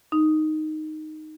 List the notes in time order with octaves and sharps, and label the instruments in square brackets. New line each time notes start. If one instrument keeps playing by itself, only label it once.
[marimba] D#4